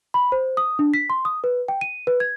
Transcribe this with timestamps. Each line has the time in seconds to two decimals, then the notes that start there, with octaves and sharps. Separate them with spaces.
0.14 B5
0.32 C5
0.57 D#6
0.79 D4
0.94 B6
1.10 C6
1.25 D#6
1.44 B4
1.68 G5
1.81 D#7
2.07 B4
2.20 G#6